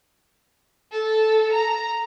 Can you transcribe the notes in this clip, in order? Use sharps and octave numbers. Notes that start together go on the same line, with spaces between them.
A4
A#5